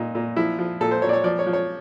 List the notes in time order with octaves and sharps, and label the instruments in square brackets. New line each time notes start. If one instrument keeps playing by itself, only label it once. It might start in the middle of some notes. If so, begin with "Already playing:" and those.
Already playing: [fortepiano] A#2 D#4
A#2
F3 E4
F3
A#2 A4
C5
A#2 C#5
D5
C#5
F3 D5
C#5
F3
C#5